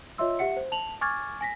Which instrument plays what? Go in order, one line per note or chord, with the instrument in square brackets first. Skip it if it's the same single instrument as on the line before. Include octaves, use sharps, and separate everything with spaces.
[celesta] F4 C#5 D#5 E5 C6 E6
G4 E5 F#5 C#7
C5
A5 F7 F#7
G#5 C#6 D6 F6 G#6 A6
G#5 A#6 B6